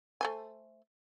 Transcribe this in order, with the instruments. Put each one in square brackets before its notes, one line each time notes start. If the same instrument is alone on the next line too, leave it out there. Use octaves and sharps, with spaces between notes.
[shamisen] A3 C5 G#5